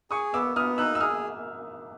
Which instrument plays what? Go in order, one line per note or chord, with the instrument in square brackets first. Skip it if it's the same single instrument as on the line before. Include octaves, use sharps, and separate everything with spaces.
[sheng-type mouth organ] G#4 [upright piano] C#6 D#6
[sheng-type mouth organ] B3 [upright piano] D6 E6
[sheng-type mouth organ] B3 [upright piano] D#6 F6
[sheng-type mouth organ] D#4 [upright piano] E6 F#6
[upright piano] E6
[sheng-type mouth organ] G#4 [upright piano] D#6 F6